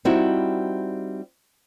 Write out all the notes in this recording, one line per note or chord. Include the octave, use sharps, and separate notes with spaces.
G3 C4 D#4 E4 F#4